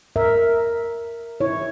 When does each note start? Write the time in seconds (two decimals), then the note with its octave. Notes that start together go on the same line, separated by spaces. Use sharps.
0.16 A#4 E5
1.40 E4 C#5